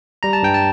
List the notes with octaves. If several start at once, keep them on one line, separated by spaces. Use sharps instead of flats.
G3 A#5
A5
G2 G5
A5